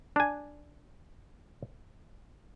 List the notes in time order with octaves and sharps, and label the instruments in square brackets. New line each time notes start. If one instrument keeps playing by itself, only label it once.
[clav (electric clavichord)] D4 G#5